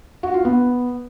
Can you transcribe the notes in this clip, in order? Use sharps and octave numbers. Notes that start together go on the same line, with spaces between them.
F#4
F4
B3